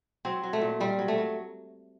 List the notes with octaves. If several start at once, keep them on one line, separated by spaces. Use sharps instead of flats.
F#3 C4
F#3
A3
A#2
A#2 G3
F#3
A3
F#3